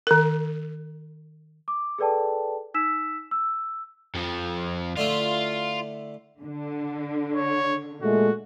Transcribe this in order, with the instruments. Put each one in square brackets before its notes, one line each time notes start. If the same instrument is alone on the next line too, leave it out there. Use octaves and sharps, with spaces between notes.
[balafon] D#3 A#4
[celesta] D6
G#4 A4 B4 D5 G5 A5
D#4 E6 B6 E7
E6
[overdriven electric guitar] F2 F3
[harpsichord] D3 A3 E4 [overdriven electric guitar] F4
[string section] D3
[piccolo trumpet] C#5
[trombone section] A#2 G#3 A3 [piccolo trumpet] F#4